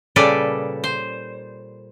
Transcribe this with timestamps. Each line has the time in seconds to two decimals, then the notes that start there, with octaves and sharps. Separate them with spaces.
0.16 A#2 C#3 G3 A4 B4 D5
0.84 C5